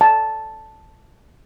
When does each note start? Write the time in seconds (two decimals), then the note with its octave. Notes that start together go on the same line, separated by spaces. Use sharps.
0.01 A5